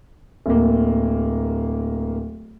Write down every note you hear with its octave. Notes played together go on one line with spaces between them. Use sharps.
D1 A#3